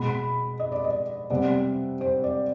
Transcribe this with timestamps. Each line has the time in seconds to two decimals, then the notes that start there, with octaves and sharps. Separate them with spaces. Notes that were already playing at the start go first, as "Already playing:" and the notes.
Already playing: B2 G#3 B3 B5
0.60 D#5
0.72 D5
0.84 D#5
1.30 C3 G3 B3 D5
2.01 C5
2.24 D5